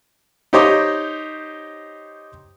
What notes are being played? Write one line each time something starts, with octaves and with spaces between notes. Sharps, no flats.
D#4 G4 C5 C#5 D#5 D6